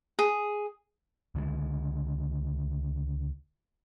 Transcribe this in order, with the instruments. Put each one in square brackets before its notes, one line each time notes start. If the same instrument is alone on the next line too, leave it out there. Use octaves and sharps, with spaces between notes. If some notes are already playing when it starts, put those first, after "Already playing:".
[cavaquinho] G#4
[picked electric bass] C#2 D3 F3 G#3